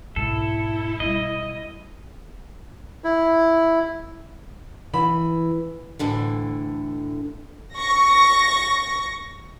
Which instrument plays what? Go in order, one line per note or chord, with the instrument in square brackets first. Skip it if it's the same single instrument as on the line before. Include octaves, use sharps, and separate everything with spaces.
[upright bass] B1 G#2 [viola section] E4 [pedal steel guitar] A4
[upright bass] B2 G3 [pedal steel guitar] D#5
[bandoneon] E4
[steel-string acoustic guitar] E3 [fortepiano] B5
[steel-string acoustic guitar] D2 A2 D3 E3
[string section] C#6 A#6